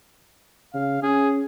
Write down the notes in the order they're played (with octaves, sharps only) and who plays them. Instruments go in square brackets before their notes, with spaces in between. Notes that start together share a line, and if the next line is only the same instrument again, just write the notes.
[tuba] C#3 [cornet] F5
[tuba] C#4 [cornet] G#4